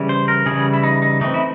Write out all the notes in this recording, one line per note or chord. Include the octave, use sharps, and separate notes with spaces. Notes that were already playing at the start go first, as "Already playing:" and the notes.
Already playing: C#3 E3 G3
C5
A#4
C#3 E3 G3 G#4
E4
D#4
D#4
E3 A3 C4 D#4
E4